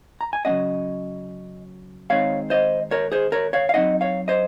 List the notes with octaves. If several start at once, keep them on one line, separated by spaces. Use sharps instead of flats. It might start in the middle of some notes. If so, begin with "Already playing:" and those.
A#5
G#5
C#3 F#3 A#3 C#4 D#5 F#5
D#3 G#3 C4 D#4 C#5 F5
C5 D#5
A#4 C#5
G#4 C5
A#4 C#5
C#5 F5
F5
F#3 C4 D#4 D#5 F#5
C#5 F5
C5 D#5